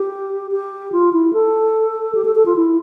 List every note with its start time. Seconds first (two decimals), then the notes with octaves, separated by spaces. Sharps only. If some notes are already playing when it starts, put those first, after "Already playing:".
Already playing: G4
0.51 G4
0.92 F4
1.13 E4
1.33 A4
2.15 G4
2.25 A4
2.35 A4
2.45 F4
2.56 E4